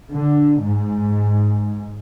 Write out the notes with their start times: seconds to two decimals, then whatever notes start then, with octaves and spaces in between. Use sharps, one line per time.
0.12 D3
0.63 G#2